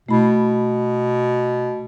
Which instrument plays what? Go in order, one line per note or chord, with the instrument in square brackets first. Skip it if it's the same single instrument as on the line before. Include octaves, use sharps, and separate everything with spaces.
[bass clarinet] B2 [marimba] A3 E4 B5